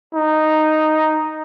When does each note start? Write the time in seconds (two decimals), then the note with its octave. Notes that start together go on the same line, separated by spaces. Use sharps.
0.15 D#4